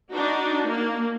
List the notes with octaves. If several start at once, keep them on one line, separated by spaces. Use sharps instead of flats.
D4 D#4 F#4
A#3